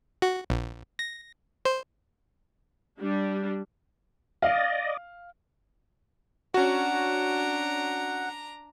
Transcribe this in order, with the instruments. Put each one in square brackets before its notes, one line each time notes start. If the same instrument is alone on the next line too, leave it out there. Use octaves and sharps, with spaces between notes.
[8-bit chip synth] F#4
A#1
A#6
C5
[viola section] G3 D4
[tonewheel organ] D5 D#5 [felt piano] F5
[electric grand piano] C#4 F#4 [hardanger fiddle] D4 A#5 [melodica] F#5